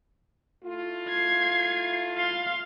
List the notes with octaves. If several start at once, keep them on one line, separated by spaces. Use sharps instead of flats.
A3 E4 F4
G#6 C7
F5 C6